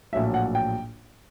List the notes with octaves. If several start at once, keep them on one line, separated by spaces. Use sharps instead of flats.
A#1 A2 F#3 A#3 E5
F#5
G5